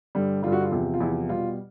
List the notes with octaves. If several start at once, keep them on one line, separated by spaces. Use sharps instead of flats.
G2 D3 G3
G2 D3 G3 F4
F#4
F4
E2 C3 F3
F4
E2 C3 F3 E4
B2 G3 F4